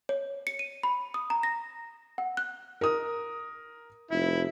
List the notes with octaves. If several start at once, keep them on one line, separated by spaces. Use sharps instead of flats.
C#5
C#7
D#7
B5
D#6
A#5
A#6
F#5
F#6
A#4 D#6
F1 E4